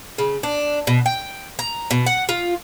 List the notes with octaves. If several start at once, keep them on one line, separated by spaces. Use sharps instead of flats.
C#3
D4
B2
G5
A#5
B2
F#5
F4